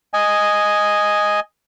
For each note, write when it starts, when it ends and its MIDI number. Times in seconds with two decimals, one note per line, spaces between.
0.13 1.40 75
0.13 1.40 80